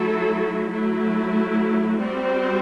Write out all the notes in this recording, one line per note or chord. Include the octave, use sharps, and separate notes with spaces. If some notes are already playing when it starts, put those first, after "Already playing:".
Already playing: F#3 A3 E4 A4
F#3 A3 E4
G3 C4 F#4 C5